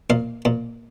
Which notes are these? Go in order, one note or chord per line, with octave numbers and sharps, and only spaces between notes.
A#2 F5
A#2